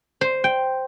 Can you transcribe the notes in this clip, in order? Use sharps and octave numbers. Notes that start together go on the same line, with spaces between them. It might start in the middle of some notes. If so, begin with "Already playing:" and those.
C5
G5